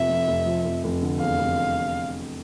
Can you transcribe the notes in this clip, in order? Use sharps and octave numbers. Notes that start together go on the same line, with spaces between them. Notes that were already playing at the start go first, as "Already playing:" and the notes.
Already playing: F1 C3 F3 E5
F2
F1
F3
F1
F1
D3
E2 F5
F1